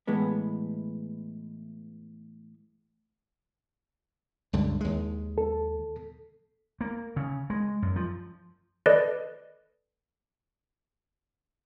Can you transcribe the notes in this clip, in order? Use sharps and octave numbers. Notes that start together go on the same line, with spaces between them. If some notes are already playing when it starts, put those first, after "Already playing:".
A2 E3 G#3 B3
C#2 G2 D3
D#2 G#3
A4
A#3
C#3
G#3
F#2
F3
A4 B4 D5 D#5